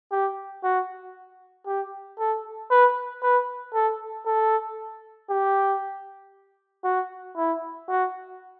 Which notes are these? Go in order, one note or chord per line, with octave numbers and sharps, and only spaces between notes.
G4
F#4
G4
A4
B4
B4
A4
A4
G4
F#4
E4
F#4